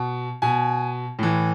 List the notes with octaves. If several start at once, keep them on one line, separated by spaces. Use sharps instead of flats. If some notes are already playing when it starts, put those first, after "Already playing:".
Already playing: B2
B2 G#5
A2 E3